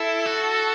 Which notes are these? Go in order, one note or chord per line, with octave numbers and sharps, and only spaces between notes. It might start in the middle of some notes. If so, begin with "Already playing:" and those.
Already playing: E4 A4
F#4